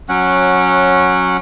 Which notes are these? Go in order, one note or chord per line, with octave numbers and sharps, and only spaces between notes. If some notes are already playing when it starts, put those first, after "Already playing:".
F#3 C#4 F#5